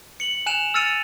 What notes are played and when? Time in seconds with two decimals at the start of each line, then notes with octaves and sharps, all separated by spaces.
0.20 C#7 F#7
0.46 G#5 F#6 E7 F7
0.74 E6 F6 A6 C#7 D#7 F7